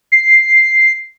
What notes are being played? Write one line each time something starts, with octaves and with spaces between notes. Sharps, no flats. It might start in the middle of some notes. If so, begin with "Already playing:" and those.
C7